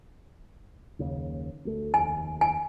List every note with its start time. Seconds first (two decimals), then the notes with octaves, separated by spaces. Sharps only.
0.99 F#1 D#2 C#3
1.65 D2 A3
1.94 F1 D#2 G#5
2.41 G#5